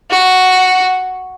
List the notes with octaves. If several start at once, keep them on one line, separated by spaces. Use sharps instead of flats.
F#4